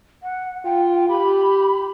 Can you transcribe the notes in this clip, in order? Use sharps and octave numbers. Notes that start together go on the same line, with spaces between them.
F#5
F4 G5
G4 B5